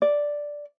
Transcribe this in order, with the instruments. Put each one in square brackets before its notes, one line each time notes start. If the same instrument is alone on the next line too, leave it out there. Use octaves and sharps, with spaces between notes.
[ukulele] D5